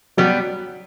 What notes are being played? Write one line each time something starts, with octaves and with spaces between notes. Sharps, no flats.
F#3 G3 B3